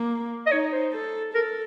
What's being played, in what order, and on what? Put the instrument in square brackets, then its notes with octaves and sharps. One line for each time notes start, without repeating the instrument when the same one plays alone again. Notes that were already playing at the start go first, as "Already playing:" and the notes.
Already playing: [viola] A#3
[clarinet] D#5
[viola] D#4 [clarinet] C#5
[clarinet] C5
[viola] A4
[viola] A4 [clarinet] A#4